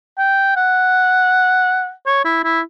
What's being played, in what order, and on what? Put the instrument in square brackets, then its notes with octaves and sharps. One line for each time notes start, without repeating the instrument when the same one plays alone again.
[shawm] G5
F#5
C#5
E4
E4